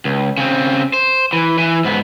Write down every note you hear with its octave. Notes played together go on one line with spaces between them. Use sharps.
C#2
C#3 C4
C5
E3
E3
G#2 B3